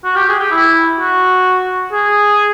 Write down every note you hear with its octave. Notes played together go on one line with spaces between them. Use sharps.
F#4
G4
G#4
G4
E4
F#4
G#4